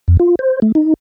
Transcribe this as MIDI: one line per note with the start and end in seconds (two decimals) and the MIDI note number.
0.08 0.17 41
0.20 0.35 65
0.39 0.60 72
0.62 0.72 57
0.75 0.94 63